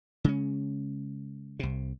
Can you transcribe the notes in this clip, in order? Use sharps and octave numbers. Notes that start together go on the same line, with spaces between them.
C#3 G#3 C#4
C2 C3